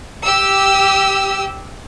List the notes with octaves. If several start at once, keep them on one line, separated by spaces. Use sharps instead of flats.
G4 E6